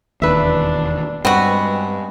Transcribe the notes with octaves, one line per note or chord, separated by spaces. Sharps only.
E1 D#2 D4 B4 E5
G2 G#3 B3 C4 F#4